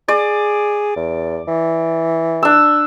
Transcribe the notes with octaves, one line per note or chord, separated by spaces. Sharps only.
G#4 D5
E2
E3
D4 E6